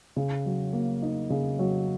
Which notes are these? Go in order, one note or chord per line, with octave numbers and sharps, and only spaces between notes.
C#3
F#3
A#3
D#4
C#3
F#3